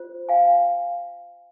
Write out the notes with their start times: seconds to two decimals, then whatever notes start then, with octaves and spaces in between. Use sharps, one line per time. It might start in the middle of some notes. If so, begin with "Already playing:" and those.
Already playing: F4 C5
0.29 F5 G#5